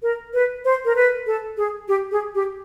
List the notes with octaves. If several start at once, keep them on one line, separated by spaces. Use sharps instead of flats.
A#4
B4
C5
A#4
B4
A4
G#4
G4
G#4
G4